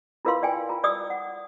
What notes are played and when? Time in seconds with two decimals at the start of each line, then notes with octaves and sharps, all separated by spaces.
0.25 E4 F4 A#4 B4 F5 C6
0.43 D5 G5 G#5
0.69 F4 A#5
0.84 D5 D#6 E6
1.10 F#5